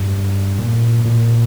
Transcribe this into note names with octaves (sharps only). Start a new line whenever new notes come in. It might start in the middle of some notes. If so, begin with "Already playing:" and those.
Already playing: G2
A#2
A#2